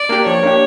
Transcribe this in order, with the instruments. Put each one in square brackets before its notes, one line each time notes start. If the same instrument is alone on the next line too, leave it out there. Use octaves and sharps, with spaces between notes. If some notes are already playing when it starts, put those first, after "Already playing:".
Already playing: [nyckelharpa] D5
[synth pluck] A#3 D4 G4
[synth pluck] F3 [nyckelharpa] C#5
[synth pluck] A#3 D4 G4